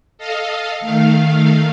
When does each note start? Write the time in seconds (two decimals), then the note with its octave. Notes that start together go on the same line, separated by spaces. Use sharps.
0.18 A4 D#5 F5
0.80 D#3 A3 F5